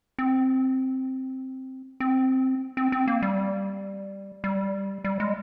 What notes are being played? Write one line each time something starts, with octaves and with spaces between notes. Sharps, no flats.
C4
C4
C4
C4
A#3
G3
G3
G3
G#3